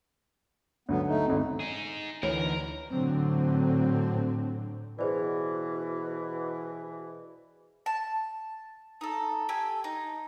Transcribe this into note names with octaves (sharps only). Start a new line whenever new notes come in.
D2 D3 F#3 B3
A3 D#4
G#1 D3 C4
D#4 G#4
D2 E3 D#4 A#4 B4 C#5
A2 D3 F#3 C4
B2 E3 G#4 C5 D5
A5
D#4 A4
G4 A4 G#5
D#4